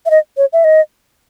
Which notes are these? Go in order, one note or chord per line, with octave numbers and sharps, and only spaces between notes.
E5
D#5
C#5
E5
D#5